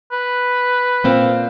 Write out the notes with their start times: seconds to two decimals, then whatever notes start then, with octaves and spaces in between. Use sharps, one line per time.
0.12 B4
1.04 A#2 C4 F5